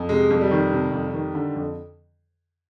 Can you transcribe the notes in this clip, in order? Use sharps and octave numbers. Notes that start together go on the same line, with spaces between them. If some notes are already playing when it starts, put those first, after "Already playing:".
Already playing: F2
C3 G#3
F2
G3
D#3
C3
F2
D#3
D3
F2